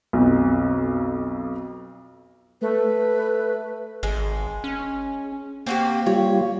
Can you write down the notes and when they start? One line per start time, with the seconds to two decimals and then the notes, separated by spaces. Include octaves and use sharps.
0.13 B1 F2
2.62 A3 B4
4.03 G#1 G#3
4.64 C#4
5.67 A#3 C4 F#4 G4
6.06 G3 F4 C#5